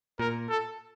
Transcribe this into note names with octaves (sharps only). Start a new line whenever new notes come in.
A#2 A#4
A4